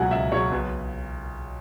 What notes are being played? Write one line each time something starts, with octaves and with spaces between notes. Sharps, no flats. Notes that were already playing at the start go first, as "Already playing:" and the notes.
Already playing: C#2 B2 F#3 F#5 G#5
C#2 E5
B2 F#3 C#5
B1 B4